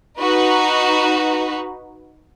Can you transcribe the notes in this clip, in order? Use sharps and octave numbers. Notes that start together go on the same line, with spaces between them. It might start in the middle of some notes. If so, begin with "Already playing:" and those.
D#4 F#4 B4